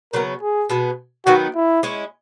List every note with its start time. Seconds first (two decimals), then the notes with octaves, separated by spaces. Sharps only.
0.13 C#3 F#3 B3 A#4
0.42 G#4
0.70 B2 G#3 B3
1.26 D#3 F#3 B3 F#4
1.55 E4
1.83 G#3 C#4 E4